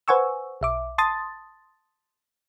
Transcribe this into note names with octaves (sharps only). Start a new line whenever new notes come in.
B4 C5 F#5 G#5 C#6 E6
B1 E5 D6
A5 C6 D#6 A6